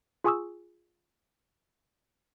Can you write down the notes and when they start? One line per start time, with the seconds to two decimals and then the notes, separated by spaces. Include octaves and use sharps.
0.24 F4 G#4 G#5 C#6 D#6 E6